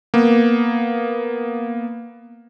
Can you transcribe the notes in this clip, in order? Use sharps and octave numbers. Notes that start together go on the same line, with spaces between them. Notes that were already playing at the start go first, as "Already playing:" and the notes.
A#3 B3